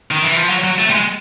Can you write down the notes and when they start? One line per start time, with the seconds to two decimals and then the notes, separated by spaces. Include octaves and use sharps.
0.11 D#3
0.24 E3
0.36 F3
0.50 F#3
0.64 F#3
0.79 A3
0.90 G3
0.93 G#3